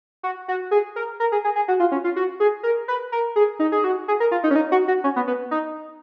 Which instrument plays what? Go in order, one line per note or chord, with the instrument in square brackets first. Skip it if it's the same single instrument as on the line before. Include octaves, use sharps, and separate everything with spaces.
[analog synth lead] F#4
F#4
G#4
A#4
A#4
G#4
G#4
G#4
F#4
F4
C#4
F4
F#4
G#4
A#4
B4
A#4
G#4
D#4
G#4
F#4
G#4
A#4
F4
D#4
C#4
D#4
F#4
F#4
C#4
B3
B3
D#4